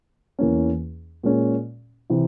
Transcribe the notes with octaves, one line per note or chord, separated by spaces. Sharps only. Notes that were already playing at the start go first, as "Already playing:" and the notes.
E2 E3 A#3 C#4
A#2 G#3 C#4
C3 E3